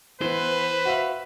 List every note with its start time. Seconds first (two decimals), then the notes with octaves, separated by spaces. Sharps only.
0.21 E3 B3 B4 C5
0.85 F#4 E5 F5